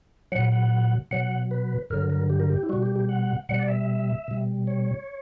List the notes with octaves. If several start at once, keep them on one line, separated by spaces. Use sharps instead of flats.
A#2 F#3 F#5
F#5
B2 F#3 F#5
B4
G2 D3 F#3 A#4
A#4
G4
A#4
G4
E4
B2 G3 F#4
G4
G4
F#5
B2 G3 F#5
D5
E5
B2 G3
C#5